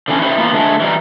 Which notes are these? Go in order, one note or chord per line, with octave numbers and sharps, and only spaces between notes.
D3 E3 C4 C#4
C#4 D#4 E4 G4 B4 C#5
E3 A#3 B3 F4
D3 G#3 A3
E3 G3 D#4